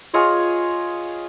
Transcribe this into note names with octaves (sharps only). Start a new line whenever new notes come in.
F4 G#4 C#5 D#5